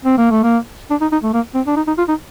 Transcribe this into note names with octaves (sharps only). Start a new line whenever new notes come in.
C4
A#3
A3
A#3
D4
D#4
D#4
A3
A#3
C4
D4
D#4
D#4
F4
D#4